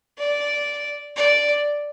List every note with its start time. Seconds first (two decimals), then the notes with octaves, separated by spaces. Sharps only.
0.18 D5
1.16 D5